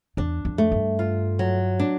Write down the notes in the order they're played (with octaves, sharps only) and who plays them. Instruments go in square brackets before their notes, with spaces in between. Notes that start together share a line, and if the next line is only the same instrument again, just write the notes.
[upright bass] E2 [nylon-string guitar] D4
[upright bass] F2
[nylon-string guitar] A3
[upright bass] G2
[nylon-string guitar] F4
F#3
D4